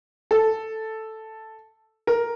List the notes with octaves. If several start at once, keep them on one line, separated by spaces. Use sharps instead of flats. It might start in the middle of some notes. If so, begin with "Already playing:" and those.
A4
A#4